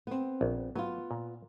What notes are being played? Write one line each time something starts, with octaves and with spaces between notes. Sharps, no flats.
B3 C4
A#1
F#3 B3 F4
A#2